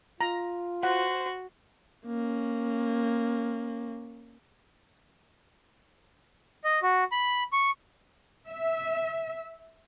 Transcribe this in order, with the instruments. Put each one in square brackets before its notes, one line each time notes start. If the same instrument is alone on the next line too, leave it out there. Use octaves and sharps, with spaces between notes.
[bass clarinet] F4 [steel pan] A#5
[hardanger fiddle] F#4 [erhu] C5 [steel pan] F#5
[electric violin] A#3 C#4
[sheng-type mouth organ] D#5
F#4
B5
C#6
[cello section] E5